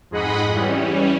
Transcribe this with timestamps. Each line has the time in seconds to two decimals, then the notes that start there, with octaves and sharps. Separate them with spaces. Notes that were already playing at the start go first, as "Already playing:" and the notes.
0.11 F2 G#2 G#4 D#5 F#5 B5
0.53 E3 G3 C#4